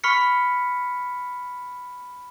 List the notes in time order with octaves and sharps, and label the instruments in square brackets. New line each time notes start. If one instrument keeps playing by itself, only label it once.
[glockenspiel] B5 C#6 F6 B6 C#7